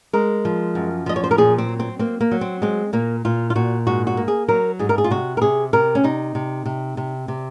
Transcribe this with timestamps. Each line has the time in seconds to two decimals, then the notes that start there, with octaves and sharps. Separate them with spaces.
0.13 G#3 A#4
0.45 F3
0.75 F#2
1.06 F3 D#5
1.16 C#5
1.24 C5
1.31 A#4
1.38 A#2 G#4
1.58 C4
1.69 F#3
1.80 C4
1.99 A#3 C4
2.21 A#3
2.31 F#3
2.41 C4
2.62 G#3 C4
2.93 A#2 A#3
3.25 A#2 F4
3.50 F4
3.55 A#2 F#4
3.87 G#2 F#4
4.07 F#4
4.17 A#3
4.28 G#4
4.48 F#3 A#4
4.79 G#2 G#4
4.89 A#4
4.98 G#4
5.04 F4
5.10 C3 F#4
5.37 A#4
5.42 C3 G#4
5.73 C3 A#4
5.95 C#4
6.04 C3 D#4
6.35 C3
6.65 C3
6.97 C3
7.28 C3